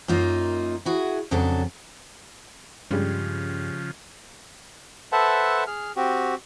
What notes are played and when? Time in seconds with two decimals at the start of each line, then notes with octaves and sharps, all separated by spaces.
0.08 F#2 A#3 D#4 F4
0.85 E4 F#4 G#4
1.31 F2 C#3 F#3 D4 A4
2.91 G2 C#3 F3 G3 G#3 C#4
5.12 A4 B4 C5 E5 F#5 A5
5.67 G#4 F6
5.96 C4 F#4 G4